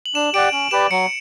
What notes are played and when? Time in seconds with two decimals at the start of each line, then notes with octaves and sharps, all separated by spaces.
0.06 F#7
0.15 D4 E7
0.34 G4 D5 F#5 D7
0.53 C#4 F#7
0.71 G4 B4 D5 E7
0.91 F#3 C#7